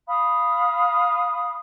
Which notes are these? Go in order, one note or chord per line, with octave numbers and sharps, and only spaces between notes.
F5 B5 D#6